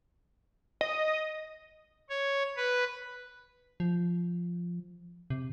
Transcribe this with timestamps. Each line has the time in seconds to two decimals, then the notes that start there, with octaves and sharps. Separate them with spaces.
0.81 D#5
2.10 C#5
2.56 B4
3.80 F3
5.30 C3